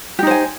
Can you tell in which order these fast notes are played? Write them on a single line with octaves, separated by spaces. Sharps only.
G4 D#4 C5 G#5